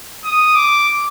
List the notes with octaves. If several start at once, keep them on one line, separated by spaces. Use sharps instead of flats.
D#6
D6